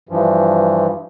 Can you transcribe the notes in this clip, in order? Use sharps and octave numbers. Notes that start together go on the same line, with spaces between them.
G2 E3 F3